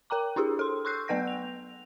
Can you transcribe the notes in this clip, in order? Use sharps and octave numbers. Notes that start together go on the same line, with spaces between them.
A#4 G5 A#5 D6
D4 E4 G4 G#4
A4 C6
C6 C#6 E6 F#6 G6 C7
F#3 B3 B4 F#5 G6 A#6
F7